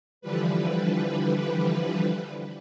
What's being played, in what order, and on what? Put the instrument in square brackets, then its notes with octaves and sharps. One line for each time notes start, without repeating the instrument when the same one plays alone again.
[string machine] D3 E3 F3 G3 B4